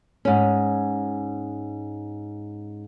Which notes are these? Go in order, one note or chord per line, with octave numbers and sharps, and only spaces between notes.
G#2 C#4